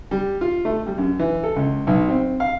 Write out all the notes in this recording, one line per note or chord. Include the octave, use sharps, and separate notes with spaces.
G3
F4
A3
G3
F#2
E3
A4
C#2
B1
C4
F5